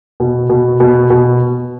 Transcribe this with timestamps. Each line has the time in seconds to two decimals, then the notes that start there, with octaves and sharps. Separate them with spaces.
0.20 B2
0.49 B2
0.80 B2
1.10 B2